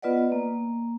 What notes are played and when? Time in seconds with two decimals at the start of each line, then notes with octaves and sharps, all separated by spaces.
0.02 B3 F4 B4 D5 D#5 F#5
0.32 A#3